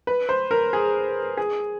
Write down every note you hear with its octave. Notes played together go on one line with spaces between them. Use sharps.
B4
C5
A#4
G#4
G#4